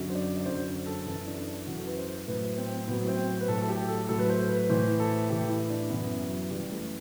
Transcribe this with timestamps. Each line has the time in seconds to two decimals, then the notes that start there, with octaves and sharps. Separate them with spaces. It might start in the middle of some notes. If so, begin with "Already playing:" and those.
Already playing: F#2 D3 F#3
0.10 C5
0.15 D5
0.37 D5
0.46 F#2 D3 F#3 C5
0.86 A4
1.06 F#2 E3 A4
1.27 D4
1.47 D4
1.67 F#2 E3 F#4
1.77 A4
1.87 B4
1.97 C5
2.27 A2 F#3 B4
2.58 C4
2.88 A2 F#3 B3
3.08 C4
3.41 B4
3.48 A2 F#3 A4
3.62 A4
3.68 G4
3.89 A4
4.09 A2 F#3 A4
4.19 B4
4.29 C5
4.49 B4
4.69 A2 E3 C5
5.00 A4
5.29 A2 E3 G4
5.49 E4
5.70 D4
5.90 F#2 E3 B3
6.20 F#3
6.50 F#2 E3 G3
6.71 A3